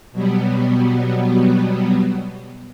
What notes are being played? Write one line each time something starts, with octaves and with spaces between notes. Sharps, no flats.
B2 F#3 G3 B3